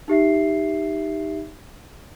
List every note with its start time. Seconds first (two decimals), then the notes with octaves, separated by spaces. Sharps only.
0.08 D#4 G4 E5 C7